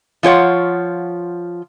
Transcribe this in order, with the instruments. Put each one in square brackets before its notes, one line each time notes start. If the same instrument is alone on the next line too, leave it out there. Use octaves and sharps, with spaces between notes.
[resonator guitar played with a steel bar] F3 F4 C#5 F#5